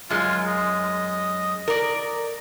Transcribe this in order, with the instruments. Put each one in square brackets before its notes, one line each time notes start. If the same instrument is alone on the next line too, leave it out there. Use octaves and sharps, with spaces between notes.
[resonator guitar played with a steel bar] F#2 G#3 [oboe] F4
[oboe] D#5
[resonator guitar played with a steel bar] A#4 D5